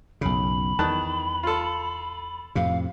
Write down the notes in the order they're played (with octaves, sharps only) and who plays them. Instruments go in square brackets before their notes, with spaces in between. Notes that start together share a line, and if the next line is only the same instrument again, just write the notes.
[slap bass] B1 F#2 C#3 [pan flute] B5
[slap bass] E2 [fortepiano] D#3 A5 F#6
[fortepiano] F4 A4
[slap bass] F2 A2 C3 [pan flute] F5